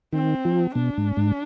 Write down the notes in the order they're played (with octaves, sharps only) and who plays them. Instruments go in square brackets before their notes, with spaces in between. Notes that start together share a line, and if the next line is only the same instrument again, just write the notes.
[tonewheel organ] D#3 [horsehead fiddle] C4
[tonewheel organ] F3
[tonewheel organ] B2 [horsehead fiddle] D4
[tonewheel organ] G#2
G#2